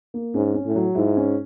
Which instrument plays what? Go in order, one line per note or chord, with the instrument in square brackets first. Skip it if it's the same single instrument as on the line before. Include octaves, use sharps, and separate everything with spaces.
[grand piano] A#3
[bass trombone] G#2 [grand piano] C#4
[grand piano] C#4
[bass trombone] A2
[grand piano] F#3
[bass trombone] G#2 [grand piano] E4
[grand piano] C#4